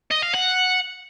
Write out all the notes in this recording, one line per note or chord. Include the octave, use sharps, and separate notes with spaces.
D#5
F5
F#5